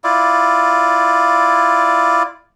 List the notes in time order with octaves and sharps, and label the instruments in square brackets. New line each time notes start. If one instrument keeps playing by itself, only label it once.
[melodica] E4 F4 D5